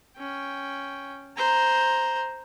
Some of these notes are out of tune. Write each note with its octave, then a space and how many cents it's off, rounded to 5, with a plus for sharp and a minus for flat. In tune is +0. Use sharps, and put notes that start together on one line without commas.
C#4 +0 G5 +0
C5 +0 A#5 +0